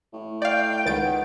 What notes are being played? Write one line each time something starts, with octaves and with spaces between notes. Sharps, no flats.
A2
D5 F5 G5
C#2 D#3 B4 F#5 A6 D7